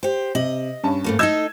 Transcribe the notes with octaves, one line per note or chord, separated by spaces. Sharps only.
G4 C5
C3 D#5 F#7
G2 C#4 A5
G#2 A3 A#3
D#4 A4 D#5 E6 G#6 E7